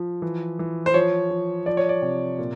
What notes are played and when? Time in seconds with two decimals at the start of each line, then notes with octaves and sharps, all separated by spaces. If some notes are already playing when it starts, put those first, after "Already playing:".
Already playing: F3
0.22 E3
0.59 E3
0.86 C5
0.94 F3 C#5
1.31 F3
1.66 F3 D5
1.77 C#5
1.89 D5
2.02 C3
2.39 A#2